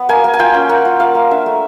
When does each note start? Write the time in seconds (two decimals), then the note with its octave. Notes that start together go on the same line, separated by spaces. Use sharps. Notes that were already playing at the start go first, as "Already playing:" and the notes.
Already playing: F#3 B3
0.09 A#3 G#5
0.24 A#3
0.34 G#5
0.39 F4 G5
0.54 C#4
0.69 A#3 F#5
0.85 F4
1.00 A#3 F5
1.15 A#3
1.31 D4 E5
1.46 A3